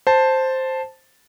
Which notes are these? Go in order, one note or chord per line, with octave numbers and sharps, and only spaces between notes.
C5 A5